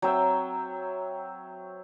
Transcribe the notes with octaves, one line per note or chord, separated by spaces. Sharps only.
F#3 C4 E5 G5